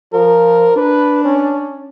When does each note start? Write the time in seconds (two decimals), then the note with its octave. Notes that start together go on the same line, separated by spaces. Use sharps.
0.13 F3 A#4
0.76 D4 B4
1.25 C#4